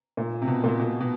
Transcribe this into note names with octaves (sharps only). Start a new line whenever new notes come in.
A#2
C3
B2
A#2
B2
B2